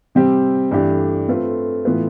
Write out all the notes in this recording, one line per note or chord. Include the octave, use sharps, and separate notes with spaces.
C3 G3 C4 G4
G2 E3 A3 D4 G4
A3 C4 F4 B4
A2 E3 B3 F4 B4